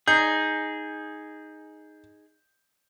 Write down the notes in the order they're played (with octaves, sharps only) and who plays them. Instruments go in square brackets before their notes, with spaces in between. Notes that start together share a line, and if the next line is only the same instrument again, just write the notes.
[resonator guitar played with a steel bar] D#4 [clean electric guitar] G#4 [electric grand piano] G6